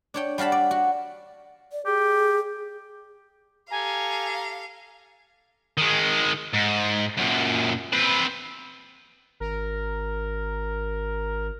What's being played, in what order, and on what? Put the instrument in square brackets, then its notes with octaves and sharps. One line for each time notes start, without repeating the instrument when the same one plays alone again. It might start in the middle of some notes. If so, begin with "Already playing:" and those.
[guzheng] D4 C#5 G5
G3 F#4 F5 A5 B5
D5
F#4
[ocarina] D5
[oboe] G4 [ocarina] G#4
[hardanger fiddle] G4 A4 [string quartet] F5 [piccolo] G#5 [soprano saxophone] A#5
[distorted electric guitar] D#3 G#3
G#2
F#2 A#2
C4 B4
[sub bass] G#1 [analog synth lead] A#4